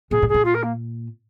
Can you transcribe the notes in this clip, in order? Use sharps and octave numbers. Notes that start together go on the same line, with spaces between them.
A#2 G#4
A#2
G#4
A#2
F4
A#4
A#3